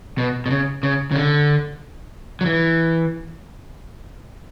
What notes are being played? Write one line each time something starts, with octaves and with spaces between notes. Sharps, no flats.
B2
B2
C#3
C#3
C#3
D3
F#3
E3